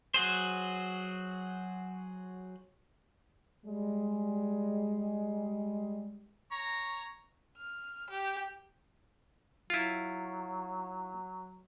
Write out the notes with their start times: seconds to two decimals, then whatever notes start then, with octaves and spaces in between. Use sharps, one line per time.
0.14 F#3 F#4 G#4 C5
3.65 G3 G#3
6.51 C#5 A#5
7.57 F6
8.10 G4
9.70 F#3 E4 F4